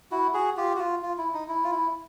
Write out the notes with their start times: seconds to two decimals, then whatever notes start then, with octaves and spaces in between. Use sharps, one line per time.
0.11 E4 F#4
0.34 F#4 G#4
0.57 F4 G4
0.76 F#4
0.79 F4
1.03 F4
1.18 E4
1.34 D#4
1.48 E4
1.64 F4
1.71 E4